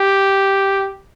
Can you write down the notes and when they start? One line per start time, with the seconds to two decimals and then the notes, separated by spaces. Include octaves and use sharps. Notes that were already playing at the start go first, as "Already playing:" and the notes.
Already playing: G4